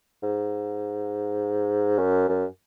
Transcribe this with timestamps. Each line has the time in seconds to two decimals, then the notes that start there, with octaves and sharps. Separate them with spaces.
0.23 G#2
1.98 F#2
2.29 F#2